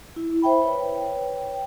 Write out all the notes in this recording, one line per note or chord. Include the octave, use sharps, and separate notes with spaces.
E4
C5 E5 G5 B5
B4 C#5 G5